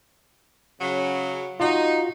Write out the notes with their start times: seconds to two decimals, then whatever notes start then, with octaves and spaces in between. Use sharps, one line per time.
0.81 C#3 F#3
1.60 D#4 F4 F#4